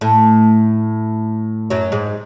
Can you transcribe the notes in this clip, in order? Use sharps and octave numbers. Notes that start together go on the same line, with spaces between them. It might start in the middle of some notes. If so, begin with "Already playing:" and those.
A2 A3
F#2 F#3
G#2 G#3